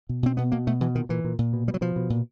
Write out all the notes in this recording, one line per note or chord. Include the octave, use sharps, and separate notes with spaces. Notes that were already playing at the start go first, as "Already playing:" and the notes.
B2
B2 C4
B2 B3
B2 A#3
B2 A3
B2 E3
A#2 D#3
A#2 E3
A#2
A#2
B2
B2 G3
F#3
B2 F3
B2
A#2